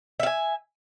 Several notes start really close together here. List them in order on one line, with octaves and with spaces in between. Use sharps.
E5 F5 G#5